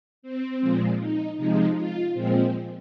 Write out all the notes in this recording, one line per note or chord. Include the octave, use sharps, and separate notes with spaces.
C4
A#2 F3 G#3
D#4
C3 F3 G#3 D#4
F4
A#2 F3 G#3 C4